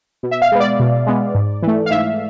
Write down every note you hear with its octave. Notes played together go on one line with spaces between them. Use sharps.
B2
E5
F5
G#3 B3
D5
B2
G#3 B3
G#2
E3 A3
F5
G#2 E5